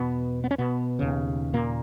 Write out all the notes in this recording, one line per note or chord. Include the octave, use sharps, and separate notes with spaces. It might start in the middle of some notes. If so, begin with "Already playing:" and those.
Already playing: E2 B2 B3
B3
C#4
B2 B3
D#2 C#3
A#2 A#3